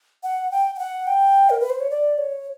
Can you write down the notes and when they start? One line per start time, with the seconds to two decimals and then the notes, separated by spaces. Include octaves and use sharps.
0.23 F#5
0.51 G5
0.75 G5
0.79 F#5
1.07 G5
1.50 A#4
1.60 B4
1.70 C5
1.80 C#5
1.90 D5
2.18 C#5